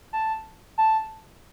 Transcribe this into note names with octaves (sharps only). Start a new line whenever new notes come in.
A5
A5